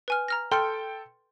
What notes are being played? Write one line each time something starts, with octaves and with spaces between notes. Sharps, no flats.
B4 G#5 F6
A#5 F6 A#6
A4 G5 C6 F6 C#7